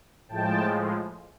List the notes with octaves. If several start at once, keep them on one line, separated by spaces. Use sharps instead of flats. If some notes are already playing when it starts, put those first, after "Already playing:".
A2 F3 G#3 G5 A5